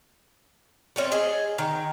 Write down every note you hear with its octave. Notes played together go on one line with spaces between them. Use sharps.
A3 C4 C#4
G#4 D#5
D#3